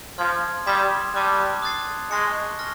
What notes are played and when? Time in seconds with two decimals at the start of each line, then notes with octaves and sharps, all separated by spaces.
0.18 F3 C6 F6 G#6
0.66 G3 C6 D#6 G#6 B6 E7
1.14 G3 A5 D6 F#6
1.62 D#6 F#6 A6 C7
2.11 G#3 C#6 F#6 A#6 C#7
2.59 C#6 F6 A#6